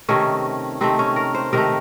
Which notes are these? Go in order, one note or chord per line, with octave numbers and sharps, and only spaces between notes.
C3 D#3 A3 C#4
C3 D#3 A3 C4
C#4
A#4
C5
C3 D#3 A3 A#4